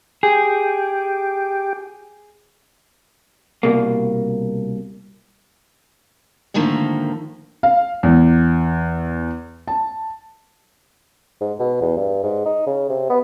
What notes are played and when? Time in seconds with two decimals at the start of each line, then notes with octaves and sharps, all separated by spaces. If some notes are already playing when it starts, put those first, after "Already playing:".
0.23 G4 G#4
3.63 C2 B2 A#3
6.54 G#2 D3 D#3 F3 A3 A#3
7.63 F5
8.03 E2
9.68 A5
11.41 G#2
11.59 B2
11.81 E2
11.97 G2
12.23 G#2
12.45 D#4
12.66 C#3
12.89 C3
13.09 B3